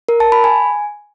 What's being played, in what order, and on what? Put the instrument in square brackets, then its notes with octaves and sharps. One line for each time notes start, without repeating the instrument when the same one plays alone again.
[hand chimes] A#4
A5
B5
G#5